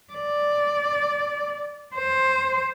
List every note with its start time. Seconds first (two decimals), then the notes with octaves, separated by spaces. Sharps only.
0.13 D5
1.96 C5